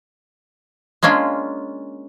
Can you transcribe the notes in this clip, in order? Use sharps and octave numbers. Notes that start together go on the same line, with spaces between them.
G#3 A#3 C#4 D4 F4